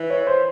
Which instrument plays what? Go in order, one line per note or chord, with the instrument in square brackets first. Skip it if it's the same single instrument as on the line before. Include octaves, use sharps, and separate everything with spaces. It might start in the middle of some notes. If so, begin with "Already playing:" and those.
Already playing: [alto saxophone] E3
[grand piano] C#5
C5